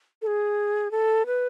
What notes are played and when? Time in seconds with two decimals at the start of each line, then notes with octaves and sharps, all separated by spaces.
0.22 A4
0.27 G#4
0.91 A4
1.26 B4